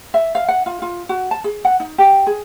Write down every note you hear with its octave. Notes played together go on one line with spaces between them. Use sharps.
E5
F5
F#5
F4
F4
F#4
A5
G#4
F#5
D#4
G4
G#4